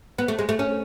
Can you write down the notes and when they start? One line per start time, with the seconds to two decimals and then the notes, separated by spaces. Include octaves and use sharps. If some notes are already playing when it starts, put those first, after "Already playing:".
0.18 B3
0.28 A3
0.39 G#3
0.49 A3
0.59 C#4